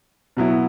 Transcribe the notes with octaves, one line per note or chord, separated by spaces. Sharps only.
B2 F#3 B3 E4